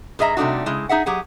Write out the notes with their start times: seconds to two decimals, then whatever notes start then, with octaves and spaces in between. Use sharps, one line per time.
0.19 G2 G#4 D#5 E5 A#5
0.37 C3 G3 A3 D4 D#4 F#4
0.66 C#3 G#3 E4
0.89 D#4 G#4 E5 F#5
1.06 F#3 G4 G#4 F#5